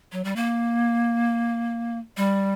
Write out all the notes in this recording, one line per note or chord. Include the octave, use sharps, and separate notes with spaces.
F#3
G3
A#3
G3